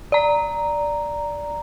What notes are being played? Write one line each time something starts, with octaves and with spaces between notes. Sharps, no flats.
D5 A#5